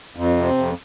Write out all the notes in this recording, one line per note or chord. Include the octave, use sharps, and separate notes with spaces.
F2
C3
F2